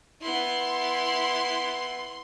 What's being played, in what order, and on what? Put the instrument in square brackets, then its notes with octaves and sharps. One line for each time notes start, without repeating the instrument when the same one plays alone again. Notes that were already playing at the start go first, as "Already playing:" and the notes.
[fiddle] B3 E4 [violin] C6